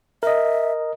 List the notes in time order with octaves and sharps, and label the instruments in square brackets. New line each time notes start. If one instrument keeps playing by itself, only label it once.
[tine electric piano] A#4 D#5 [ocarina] E5